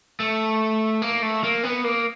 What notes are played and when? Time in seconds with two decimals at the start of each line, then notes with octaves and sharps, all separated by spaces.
0.20 A3
1.02 A#3
1.22 A3
1.44 A#3
1.63 B3
1.84 A#3